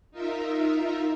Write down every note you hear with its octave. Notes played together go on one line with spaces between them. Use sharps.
D#4 F4 A#4 E5